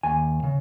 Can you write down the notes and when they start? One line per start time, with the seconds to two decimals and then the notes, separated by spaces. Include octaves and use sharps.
0.03 D#2 G#5
0.43 C#3